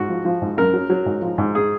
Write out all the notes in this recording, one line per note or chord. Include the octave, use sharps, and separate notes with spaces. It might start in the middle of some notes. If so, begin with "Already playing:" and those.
Already playing: G#2 F#4
F3
F3
G#2
F#2 A#4
F#3
F#3
G#2
F3
G#2
G#4